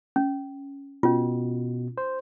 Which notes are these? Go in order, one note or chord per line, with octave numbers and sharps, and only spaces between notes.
C#4
B2 C#4 F4
C5